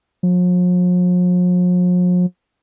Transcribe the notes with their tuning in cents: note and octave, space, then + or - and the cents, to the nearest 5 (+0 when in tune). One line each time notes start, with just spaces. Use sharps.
F3 +45